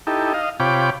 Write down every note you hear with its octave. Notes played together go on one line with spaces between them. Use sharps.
D#4 E4 G4 A4
D#5 F5
C3 F4 C#5 G5 B5 D6